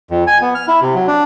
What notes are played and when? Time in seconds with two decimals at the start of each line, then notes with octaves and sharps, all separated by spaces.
0.11 F2
0.27 G#5
0.42 B3
0.55 F6
0.68 E4
0.82 C3
0.95 F#3
1.07 D4